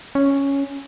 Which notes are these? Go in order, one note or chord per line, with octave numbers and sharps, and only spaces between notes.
C#4